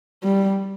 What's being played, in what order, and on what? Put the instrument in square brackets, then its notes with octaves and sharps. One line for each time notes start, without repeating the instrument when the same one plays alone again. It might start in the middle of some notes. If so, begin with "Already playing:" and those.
[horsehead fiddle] G3